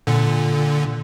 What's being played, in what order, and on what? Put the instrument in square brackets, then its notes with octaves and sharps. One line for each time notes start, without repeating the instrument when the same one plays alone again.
[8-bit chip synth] A#2 D3